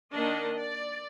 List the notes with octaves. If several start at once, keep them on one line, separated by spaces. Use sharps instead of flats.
D#3 A#3 D4 D#5
D5